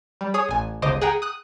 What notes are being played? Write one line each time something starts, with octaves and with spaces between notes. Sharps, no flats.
G3
G#4 C#5 D#6
A1 G#5
G1 C#2 C#3 C5 D#5 D6
G#4 F#5 G5 A#5
D#6 F#6